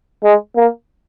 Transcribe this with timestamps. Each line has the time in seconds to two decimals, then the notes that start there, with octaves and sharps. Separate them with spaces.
0.24 G#3
0.57 A#3